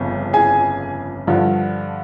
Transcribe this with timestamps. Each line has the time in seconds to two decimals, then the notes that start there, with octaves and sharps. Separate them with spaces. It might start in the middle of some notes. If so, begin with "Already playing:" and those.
Already playing: G1 F2 C#3
0.33 G#4 G#5
1.27 G2 D3 F3